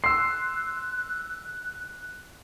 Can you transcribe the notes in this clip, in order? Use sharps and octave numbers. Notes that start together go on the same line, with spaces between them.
C6 E6 F#6 C7